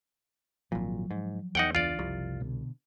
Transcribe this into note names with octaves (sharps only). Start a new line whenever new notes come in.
G#1 A#2 F3 F#3
G#2
E2 D#4 F#5 G5
C#2 E3 D4 F4 D5
F#1 C2 C3 F3
B2 D3